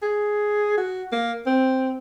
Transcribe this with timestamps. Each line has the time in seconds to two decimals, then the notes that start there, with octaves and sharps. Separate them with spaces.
0.02 G#4
0.77 F#4
1.12 A#3
1.46 C4